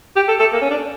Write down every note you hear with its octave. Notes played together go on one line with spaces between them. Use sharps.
G4
A4
A4
A#3
C#4
D4